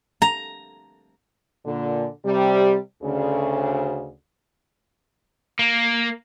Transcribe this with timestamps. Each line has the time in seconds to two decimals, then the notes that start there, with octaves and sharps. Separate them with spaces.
0.22 A#5
1.66 A#2 D3
2.24 C3 G3
3.03 D2 C#3
5.59 A#3